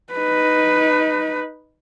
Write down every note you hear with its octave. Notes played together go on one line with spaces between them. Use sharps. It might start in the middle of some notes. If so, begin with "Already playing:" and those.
D#4 B4